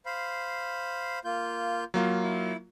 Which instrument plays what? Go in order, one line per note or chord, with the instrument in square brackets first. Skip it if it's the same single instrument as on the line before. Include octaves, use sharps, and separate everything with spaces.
[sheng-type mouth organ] C5 F5 B5
A#3 F4 G6
[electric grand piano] F#3 A#3 F4
[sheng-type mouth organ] E4